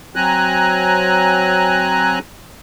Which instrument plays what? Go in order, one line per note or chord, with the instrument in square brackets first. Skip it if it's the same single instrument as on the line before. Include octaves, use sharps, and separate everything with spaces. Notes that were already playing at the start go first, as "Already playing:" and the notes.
[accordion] F#3 C4 G#5 A#5 F#6